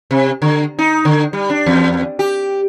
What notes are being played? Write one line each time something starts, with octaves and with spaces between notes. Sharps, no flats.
C3
D3
D#4
D3
G3
D4
E2
G4